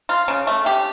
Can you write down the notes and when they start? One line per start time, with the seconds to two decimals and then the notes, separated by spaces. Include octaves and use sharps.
0.09 F4
0.28 C#3
0.47 A3
0.66 G4